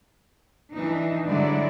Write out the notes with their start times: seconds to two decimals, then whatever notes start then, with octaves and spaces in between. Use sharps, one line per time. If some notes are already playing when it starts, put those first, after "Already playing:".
0.73 E3 D4 D#4
1.27 G2 D3 F#3 G#3 E4 D5